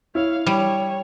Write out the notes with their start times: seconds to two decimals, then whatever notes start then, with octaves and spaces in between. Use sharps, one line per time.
0.15 E4 C#5 F5
0.46 G3 C#5